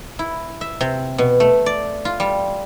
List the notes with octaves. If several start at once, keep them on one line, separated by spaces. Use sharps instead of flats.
E4
E5
C3
B2
A3
D5
F4
G3